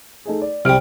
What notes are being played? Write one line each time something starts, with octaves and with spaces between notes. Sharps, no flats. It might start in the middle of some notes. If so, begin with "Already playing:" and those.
A3 D#4 G#4
D5
C2 C3 G3 F6 D7